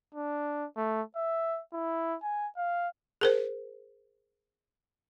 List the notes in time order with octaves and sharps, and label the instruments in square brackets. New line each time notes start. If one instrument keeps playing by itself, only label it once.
[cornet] D4
A3
E5
E4
G#5
F5
[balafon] G#4 A#4 C5